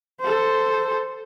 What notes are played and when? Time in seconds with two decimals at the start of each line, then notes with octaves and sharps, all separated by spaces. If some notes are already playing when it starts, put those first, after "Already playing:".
0.21 A4 C5